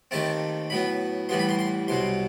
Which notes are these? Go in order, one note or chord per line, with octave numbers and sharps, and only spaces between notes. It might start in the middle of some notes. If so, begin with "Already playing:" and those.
D#2 D#3 A3 C4 A5
A2 F#3 B3 B5
A2 E3 G3 B3 C6
B5
C6
C6
C2 B2 F#3 C6